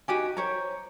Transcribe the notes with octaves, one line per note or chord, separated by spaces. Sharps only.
D#4 F#4 G4 G#5
C5 C#5 A#5